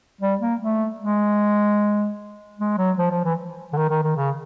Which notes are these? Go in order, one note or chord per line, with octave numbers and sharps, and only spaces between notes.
G3
A#3
A3
G#3
G#3
F#3
F3
F3
E3
D3
D#3
D#3
D#3
C#3